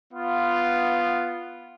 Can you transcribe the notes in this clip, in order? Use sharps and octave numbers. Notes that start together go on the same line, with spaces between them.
B3 F4